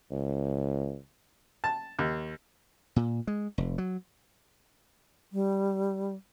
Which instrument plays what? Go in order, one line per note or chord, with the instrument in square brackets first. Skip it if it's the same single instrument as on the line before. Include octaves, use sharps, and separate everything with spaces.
[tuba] C#2
[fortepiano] A5
D#2
[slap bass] A#2
G#3
F1
F#3
[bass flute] G3